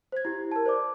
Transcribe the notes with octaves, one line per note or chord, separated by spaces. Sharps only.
C5 G#6
E4 G4
A#4 A5
C5 D5 D6